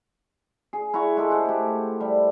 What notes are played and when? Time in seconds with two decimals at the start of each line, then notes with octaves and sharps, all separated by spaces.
0.73 G#4
0.94 E4 F#5 A#5 C#6
1.17 G#3 G4 A4
1.30 C5 F#5
1.45 A3 G4
2.00 G3